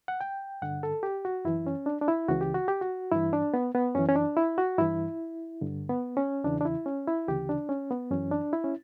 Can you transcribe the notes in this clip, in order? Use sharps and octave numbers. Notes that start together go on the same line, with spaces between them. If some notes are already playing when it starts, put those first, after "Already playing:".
F#5
G5
G2 D3 F#5
A4
G4
F#4
F#2 E3 E4
C#4
D4
D4
E4
C#2 C#3 E3 F#4
G4
F#4
G4
F#4
G2 E3 E4
D4
B3
B3
F#2 E3 C#4
C#4
D4
E4
F#4
G2 E3 E4
G2 D3
B3
C#4
E2 C#3 E3 D4
D4
E4
C#4
E4
D2 C#3 E3 G4
D4
C#4
B3
F#2 E3 C#4
D4
E4
C#4